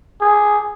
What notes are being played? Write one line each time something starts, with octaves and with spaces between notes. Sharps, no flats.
G#4